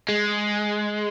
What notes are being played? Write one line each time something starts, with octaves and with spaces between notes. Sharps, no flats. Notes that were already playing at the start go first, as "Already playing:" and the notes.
G#3